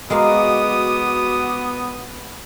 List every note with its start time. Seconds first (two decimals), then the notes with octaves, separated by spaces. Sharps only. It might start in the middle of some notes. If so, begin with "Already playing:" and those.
0.10 G#3 B3 F#4 A#4 F5 D6 D#6